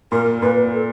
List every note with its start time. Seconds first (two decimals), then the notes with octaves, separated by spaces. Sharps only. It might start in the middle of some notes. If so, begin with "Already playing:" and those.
0.12 A#2 A#4
0.42 A#2 B4
0.73 A4